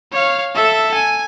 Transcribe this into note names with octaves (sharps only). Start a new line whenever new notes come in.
C#5 F5
A4 E5
G#5